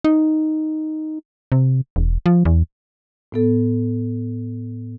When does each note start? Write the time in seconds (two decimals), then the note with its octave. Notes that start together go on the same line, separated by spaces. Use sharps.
0.04 D#4
1.52 C3
1.96 E1
2.26 F3
2.45 E2
3.32 A2 B3 A4